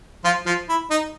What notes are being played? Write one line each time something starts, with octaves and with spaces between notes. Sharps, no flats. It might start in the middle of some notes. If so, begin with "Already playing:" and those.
F3 F4
F3 F4
E4
D#4